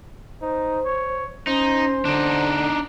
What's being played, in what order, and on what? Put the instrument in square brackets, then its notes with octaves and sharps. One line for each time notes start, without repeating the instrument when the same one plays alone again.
[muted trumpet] D#4 [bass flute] C5
[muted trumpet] C#5
[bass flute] C#4 [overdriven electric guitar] D#4 [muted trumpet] C5
[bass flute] D3 [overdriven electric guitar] D4 D#4